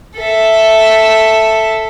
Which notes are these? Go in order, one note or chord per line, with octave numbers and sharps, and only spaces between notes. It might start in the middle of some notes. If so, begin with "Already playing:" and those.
A4 E5